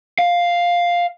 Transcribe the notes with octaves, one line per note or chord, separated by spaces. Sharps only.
F5